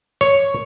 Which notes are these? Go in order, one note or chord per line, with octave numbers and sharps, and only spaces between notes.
C#5